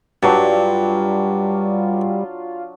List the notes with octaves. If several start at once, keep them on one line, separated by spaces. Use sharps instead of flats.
G2 F#3 G3 D4 F4